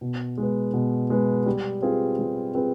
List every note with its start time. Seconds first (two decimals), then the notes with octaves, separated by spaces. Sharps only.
0.01 B2
0.38 G#3
0.43 B3
0.74 B2
1.10 G#3 B3
1.46 G3
1.82 C4 F4 G#4 B4
2.19 G3
2.55 C4 F4 G#4 B4